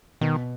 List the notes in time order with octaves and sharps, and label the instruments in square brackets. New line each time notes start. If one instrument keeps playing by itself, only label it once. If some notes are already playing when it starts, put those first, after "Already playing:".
[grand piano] B2 [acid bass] D#3